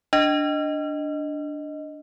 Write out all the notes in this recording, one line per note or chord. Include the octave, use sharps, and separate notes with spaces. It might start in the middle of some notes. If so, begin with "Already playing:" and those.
D4 D#5